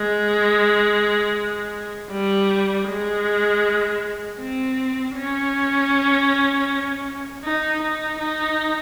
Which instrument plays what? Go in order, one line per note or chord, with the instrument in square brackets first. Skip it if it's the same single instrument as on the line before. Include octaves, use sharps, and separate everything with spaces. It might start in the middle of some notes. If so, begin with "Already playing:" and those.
Already playing: [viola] G#3
G3
G#3
C4
C#4
D#4
D#4
D#4